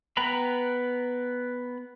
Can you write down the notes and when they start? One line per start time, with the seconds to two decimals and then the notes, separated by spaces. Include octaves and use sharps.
0.17 B3 B4 G5 A#5 B5